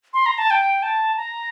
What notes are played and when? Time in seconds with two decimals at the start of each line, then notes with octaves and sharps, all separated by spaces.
0.14 C6
0.26 A#5
0.38 A5
0.50 G5
0.83 A5
1.17 A#5